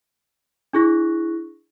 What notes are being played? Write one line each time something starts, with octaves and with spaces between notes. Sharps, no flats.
D4 E4 G#4 C#6 F#6 A#6